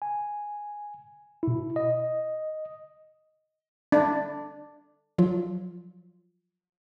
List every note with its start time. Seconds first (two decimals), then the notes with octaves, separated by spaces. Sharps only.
0.02 G#5
1.43 B2 E4
1.76 D#5
3.92 D4
5.18 F3 F#3 F4